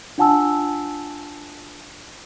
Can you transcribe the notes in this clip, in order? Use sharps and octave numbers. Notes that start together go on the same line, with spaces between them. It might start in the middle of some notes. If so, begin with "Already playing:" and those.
D4 F4 F#5 G#5 A5 E6